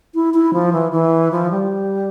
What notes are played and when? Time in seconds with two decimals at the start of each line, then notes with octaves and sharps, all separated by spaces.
0.15 E4
0.34 E4
0.53 F3
0.73 E3
0.92 E3
1.31 F3
1.51 G3